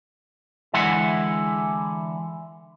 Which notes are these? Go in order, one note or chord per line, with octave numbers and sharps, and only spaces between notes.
D3 E3 G#3 E4 F#5